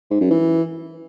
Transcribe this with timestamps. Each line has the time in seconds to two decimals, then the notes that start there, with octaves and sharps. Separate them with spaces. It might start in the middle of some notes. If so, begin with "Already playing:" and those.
0.11 G#2
0.21 F#2
0.31 E3